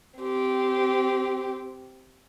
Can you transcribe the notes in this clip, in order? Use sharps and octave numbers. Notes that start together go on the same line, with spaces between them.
C4 G4